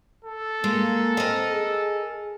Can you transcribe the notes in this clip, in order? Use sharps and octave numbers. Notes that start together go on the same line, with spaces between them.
A4
G#3 A#3
C4 A#4 D#5
G#4